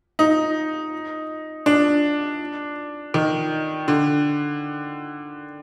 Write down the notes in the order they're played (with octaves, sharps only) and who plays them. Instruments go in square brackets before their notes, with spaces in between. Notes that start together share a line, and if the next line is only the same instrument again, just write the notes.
[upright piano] D#4
D4
D#3
D3